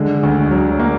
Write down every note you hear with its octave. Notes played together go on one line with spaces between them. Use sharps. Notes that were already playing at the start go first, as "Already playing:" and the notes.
Already playing: D3 G#3
D2
F#3
A#3